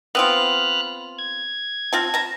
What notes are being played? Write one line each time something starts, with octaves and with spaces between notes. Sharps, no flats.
B3 C4 F4 B5 F6 F#6
G#6
C4 F4 A5
A5 A#5